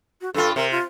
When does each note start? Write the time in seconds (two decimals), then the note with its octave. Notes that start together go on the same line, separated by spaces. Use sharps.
0.21 F#4
0.34 G2 F4 A4
0.56 C3 A#4
0.71 F4